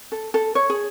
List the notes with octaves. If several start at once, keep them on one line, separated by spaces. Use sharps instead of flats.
A4
A4
C#5
G#4